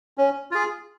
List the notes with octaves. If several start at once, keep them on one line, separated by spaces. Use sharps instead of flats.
C#4
F4 G#4